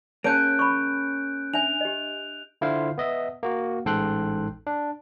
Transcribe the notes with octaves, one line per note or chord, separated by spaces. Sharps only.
A#3 C#4 G#4 C#5 A5 F#6 G6 D7
B5 C#6
D4 E5 G#5 F7
G4 D#5
D3 E4 F4 C5 F5
B3 D#5 E5
A#3 F#4
A1 G#2 A4 G5 C6 F#6
D4